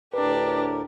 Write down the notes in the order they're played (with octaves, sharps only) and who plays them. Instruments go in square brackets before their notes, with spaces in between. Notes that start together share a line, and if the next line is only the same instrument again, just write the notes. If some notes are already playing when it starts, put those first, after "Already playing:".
[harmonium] D2 A2 A#4 [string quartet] D4 G4 [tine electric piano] B4